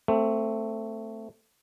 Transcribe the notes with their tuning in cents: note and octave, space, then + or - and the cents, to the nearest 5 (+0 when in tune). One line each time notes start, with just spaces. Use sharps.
A3 +15 C4 +0